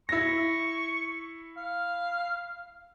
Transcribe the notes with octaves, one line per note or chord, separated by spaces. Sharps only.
E4 C#6 A#6
F5